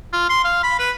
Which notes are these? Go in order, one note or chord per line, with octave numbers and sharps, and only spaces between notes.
F4
C6
F5
B5
B4